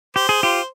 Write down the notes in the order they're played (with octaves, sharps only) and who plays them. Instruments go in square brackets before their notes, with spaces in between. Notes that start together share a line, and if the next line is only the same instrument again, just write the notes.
[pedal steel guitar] G4 [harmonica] C5
[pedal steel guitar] G#4
F4 G4